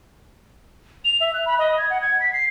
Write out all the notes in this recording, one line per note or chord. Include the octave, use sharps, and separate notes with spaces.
F7
E5
F#6
B5
D#5
G#6
F#5
G#6
B6
C7